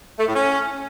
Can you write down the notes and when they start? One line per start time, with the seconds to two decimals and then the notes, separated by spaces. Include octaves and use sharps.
0.19 A3
0.27 A2
0.35 C#4